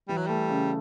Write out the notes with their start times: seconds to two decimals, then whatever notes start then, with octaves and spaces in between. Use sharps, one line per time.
0.08 E3 G3
0.17 F#3
0.27 G3 A3
0.50 C#3